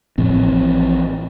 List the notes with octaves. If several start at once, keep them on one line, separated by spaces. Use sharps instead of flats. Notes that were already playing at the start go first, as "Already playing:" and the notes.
A1 A2 F3 C4